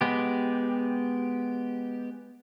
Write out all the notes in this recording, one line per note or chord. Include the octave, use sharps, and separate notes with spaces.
G#3 B3 G4